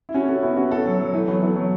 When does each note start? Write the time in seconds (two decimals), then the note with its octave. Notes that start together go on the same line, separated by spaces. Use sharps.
0.09 E4
0.14 C#4 F#4
0.23 A4
0.29 C#4 F#4
0.43 B3 E4
0.57 C#4 F#4
0.71 E4 A4
0.86 F#3
0.99 F#3
1.13 E3 A3
1.28 F#3 B3
1.42 E3 A3
1.56 F#3